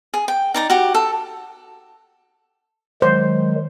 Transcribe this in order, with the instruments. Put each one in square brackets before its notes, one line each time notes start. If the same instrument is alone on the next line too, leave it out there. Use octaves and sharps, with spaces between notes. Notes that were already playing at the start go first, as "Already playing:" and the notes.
[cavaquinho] G#4
G5
D#4 D5 A#5
F#4 G4
A4
[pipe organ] D#3 F#3 G#3 [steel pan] C5